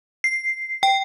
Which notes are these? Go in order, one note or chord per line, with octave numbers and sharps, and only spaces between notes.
C7
G5